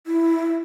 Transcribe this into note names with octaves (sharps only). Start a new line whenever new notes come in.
E4